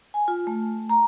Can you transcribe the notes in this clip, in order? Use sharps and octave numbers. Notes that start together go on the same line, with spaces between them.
G#5
F4
A3
A#5